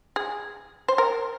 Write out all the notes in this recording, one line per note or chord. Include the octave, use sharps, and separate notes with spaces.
G#4
C5
A#4